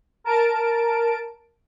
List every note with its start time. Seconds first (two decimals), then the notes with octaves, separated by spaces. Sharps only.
0.24 A#4 A5 D7